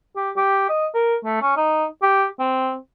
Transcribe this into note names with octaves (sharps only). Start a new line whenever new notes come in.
G4
G4
D#5
A#4
A3
C#4
D#4
G4
C4